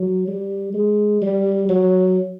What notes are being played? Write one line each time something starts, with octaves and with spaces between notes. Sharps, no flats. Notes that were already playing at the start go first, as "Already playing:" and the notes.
Already playing: F#3
G3
G#3
G3
F#3